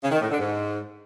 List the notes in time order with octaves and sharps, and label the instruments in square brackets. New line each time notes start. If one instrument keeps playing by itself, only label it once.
[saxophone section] C#3
D#3
A2
D3
G#2